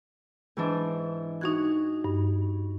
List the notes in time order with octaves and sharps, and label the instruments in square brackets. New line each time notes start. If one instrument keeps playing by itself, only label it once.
[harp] G#2 E3 D4
[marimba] D#4 G#6 [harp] F#4 F#6
[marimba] G2